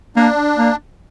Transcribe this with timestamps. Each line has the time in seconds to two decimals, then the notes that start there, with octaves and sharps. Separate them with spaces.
0.16 A#3 D4
0.58 A#3